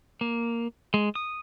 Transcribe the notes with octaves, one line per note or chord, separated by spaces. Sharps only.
A#3
G#3
D#6